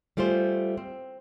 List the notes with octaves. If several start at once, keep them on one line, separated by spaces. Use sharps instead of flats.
G3 A3 F4 G#4 C5
C4